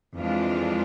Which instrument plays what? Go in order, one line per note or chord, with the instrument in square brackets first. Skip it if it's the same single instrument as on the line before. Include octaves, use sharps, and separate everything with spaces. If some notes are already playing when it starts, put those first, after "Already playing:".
[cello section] F2 E3 G#3 D4 F4